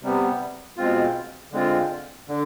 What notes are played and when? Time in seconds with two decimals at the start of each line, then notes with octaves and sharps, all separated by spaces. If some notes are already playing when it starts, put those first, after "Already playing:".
0.03 C3 G3 B3
0.77 B2 G#3 C4 F4
1.52 D3 G#3 C4 F4
2.28 D3